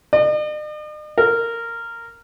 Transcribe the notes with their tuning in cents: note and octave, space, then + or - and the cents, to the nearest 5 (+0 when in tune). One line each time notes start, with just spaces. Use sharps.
D#5 -45
A#4 -10